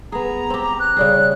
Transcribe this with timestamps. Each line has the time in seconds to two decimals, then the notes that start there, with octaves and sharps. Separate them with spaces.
0.12 B3 G#4 A#5
0.50 C4 G4
0.80 F#6
0.97 C#3 G3 G#4